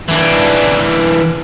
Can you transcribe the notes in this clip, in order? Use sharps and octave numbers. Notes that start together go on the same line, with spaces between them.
E3 D4